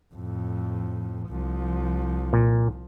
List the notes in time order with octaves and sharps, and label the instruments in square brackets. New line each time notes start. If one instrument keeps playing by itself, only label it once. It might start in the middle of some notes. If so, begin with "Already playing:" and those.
[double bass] F2 A2
C2 F3
[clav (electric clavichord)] A#2